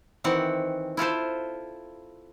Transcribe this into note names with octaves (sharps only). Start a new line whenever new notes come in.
D#3 E3 C4 F#5
E4 F4 A4 C5